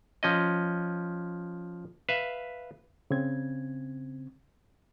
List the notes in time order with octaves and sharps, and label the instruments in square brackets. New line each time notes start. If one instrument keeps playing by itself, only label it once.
[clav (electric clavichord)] F3 C#4 D#5
B4 E5 F5
[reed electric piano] C#3 C4 G#6